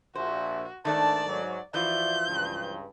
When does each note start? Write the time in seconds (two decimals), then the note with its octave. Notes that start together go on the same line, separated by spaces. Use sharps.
0.15 A#1 F#4 C5 E5
0.85 G#2 D#3 A3 D4 A4 D5 A5
1.25 G#2 F#3
1.74 E3 F3 F4 F#4 D5 E5 G6
2.27 C#2 G2